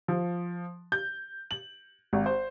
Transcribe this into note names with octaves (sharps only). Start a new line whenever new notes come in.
F3
G6
F#7
G#1
C5